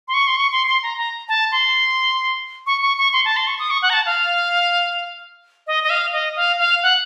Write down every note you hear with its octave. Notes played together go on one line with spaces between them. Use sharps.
C6
C#6
C6
C#6
C6
C6
A#5
A#5
A5
C6
C#6
C#6
C#6
C6
A5
C6
C#6
D#6
C#6
F#5
A#5
A5
F5
D#5
D#5
F5
D#5
F5
F5
F#5